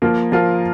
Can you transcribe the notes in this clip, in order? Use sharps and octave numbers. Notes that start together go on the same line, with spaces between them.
F3 A#3 F4 A#4
F3 A#3 F4 A#4